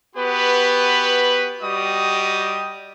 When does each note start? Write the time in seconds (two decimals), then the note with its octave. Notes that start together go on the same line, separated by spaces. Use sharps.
0.16 B3 F#4 G4 B4 B5
1.62 G3 F#4 G4 D#5 D#6